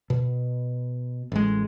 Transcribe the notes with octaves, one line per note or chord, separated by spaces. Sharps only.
B2
A1 G#3